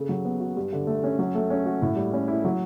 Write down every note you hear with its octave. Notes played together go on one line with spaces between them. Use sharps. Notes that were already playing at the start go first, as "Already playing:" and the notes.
Already playing: C#3 A4
F#3
B3
F#4
G2
D3
A3
C#4
F#3
A3
C#4
F#4
A2
G3
C#4
E4
F#3